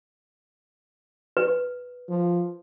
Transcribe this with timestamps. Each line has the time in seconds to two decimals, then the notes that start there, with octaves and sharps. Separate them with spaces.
1.37 B4
2.09 F3